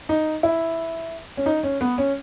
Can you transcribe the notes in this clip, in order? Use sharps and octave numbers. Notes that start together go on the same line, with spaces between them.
D#4
E4
C#4
D#4
C#4
B3
C#4